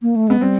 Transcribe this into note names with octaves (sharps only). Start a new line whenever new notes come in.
A#3
A3
G#3 B3
G3 C4